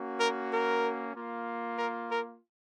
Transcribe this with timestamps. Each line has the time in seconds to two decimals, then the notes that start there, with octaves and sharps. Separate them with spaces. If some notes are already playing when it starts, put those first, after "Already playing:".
Already playing: A#3 C#4 F#4
0.19 A#4
0.51 A#4
1.15 A#3 F4
1.79 A#4
2.11 A#4